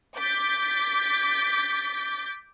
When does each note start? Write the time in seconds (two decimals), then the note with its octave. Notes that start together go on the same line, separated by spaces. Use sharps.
0.16 D6 G6 A6 B6